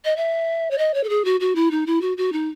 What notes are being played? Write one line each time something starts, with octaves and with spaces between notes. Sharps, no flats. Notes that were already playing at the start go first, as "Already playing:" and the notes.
D#5
E5
C#5
D#5
C#5
A4
G#4
F#4
F#4
E4
D#4
E4
F#4
F#4
D#4